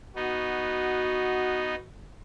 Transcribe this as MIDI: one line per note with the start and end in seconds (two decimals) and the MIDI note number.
0.16 1.75 59
0.16 1.75 63
0.16 1.87 66